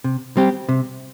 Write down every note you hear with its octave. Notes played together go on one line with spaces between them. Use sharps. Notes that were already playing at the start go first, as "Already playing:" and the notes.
C3
G3 C4 G4
C3